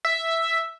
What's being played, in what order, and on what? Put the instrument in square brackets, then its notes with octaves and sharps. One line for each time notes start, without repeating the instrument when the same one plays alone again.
[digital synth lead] E5